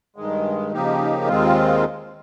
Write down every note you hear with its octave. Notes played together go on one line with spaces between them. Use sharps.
G2 D#3 G#3
C#3 F3 A#3 D#4 G4
D#2 D#3 G#3 C4 F4